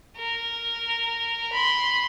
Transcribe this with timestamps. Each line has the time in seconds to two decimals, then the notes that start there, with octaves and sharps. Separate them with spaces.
0.17 A#4
1.52 B5 C6